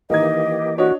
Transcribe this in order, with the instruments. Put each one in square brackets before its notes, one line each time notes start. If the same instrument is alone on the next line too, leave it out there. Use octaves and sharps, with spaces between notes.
[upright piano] D#3 D#4 G#6 [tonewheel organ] E3 A#3 G4 [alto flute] D#5
[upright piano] D4 C#5 D#5 [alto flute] F#4